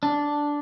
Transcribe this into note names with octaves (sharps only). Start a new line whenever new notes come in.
D4